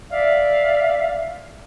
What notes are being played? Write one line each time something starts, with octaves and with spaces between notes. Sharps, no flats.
D5 E5 F5